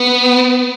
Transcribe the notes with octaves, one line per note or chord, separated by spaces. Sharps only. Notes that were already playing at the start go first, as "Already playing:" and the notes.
Already playing: B3